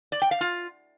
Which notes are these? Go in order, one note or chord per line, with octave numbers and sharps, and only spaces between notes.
D5
G5
F5
F4